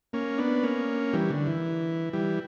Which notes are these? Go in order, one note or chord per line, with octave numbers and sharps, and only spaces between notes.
A#3 C#4
B3 D4
A#3 C#4
E3 G3
D3
E3
E3 G3